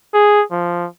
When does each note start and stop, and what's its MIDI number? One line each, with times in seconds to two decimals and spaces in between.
0.14 0.42 68
0.51 0.87 53